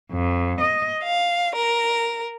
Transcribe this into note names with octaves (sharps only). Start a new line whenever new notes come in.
F2
D#5
F5
A#4